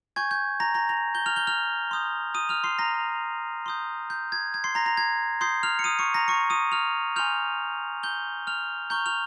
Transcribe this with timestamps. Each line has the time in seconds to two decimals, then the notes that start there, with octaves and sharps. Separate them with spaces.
0.16 G#5 C#6 G6 G#6
0.31 G6
0.60 A#5 A#6
0.74 A#5 A#6
0.89 A#5 A#6
1.15 G6 G7
1.26 F6 F7
1.36 G6 G7
1.47 F6 F7
1.91 C6 D#6 G6
2.34 D#6 D#7
2.49 F6 F7
2.64 C6 C7
2.79 A#5 A#6
3.66 C6 D#6 G6
4.10 G6
4.32 G#6
4.54 G#6
4.64 C6 C7
4.75 A#5 A#6
4.86 A#5 A#6
4.97 G#6
5.41 C6 D#6 G6 C7
5.63 F6 F7
5.79 C#7
5.84 D#6 D#7
5.99 C#6 C#7
6.14 A#5 A#6
6.28 C#6 C#7
6.50 D#6 D#7
6.72 F6 F7
7.16 G#5 C6 F6 G6 F7
8.03 G6 G7
8.47 F6 F7
8.90 A#5 C#6 F6 G6 G7
9.06 F6 F7